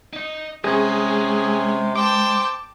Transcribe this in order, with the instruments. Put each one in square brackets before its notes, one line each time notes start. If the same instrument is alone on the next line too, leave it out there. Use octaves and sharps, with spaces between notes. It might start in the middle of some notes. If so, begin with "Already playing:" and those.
[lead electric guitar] D#4 D#5
[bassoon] C3 [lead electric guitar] G#3 [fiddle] C#4 [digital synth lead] G#4
[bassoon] C5 [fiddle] G5 A5 [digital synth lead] D6